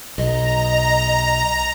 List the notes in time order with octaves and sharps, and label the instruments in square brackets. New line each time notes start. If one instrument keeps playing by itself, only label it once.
[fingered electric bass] B1 [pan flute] D#5 [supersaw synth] A#5